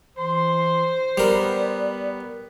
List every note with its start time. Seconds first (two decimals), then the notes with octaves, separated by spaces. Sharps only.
0.17 E3 C5 C6
1.18 G3 B3 A#4 D5